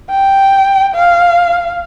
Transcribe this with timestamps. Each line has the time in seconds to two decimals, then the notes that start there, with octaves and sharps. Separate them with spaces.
0.10 G5
0.94 F5